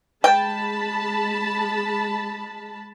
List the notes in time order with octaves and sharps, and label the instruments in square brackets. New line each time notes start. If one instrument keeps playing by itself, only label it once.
[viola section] G#3 A5 B5 [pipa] G5